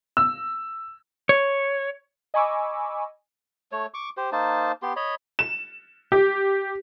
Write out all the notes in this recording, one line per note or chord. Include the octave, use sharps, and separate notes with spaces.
E6
C#5
D#5 G#5 B5 C#6 D6 E6
A3 C#5
C#6 D6
G4 C5
A#3 D#4 C5 A5
B3 G4 C6
C#5 D#5 B5
E7
G4